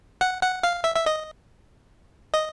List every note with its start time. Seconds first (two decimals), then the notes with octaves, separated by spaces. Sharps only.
0.21 F#5
0.42 F#5
0.63 F5
0.84 E5
0.96 E5
1.06 D#5
2.33 D#5